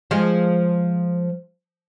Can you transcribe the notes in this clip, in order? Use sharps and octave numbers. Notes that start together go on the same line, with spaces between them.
F3 G#3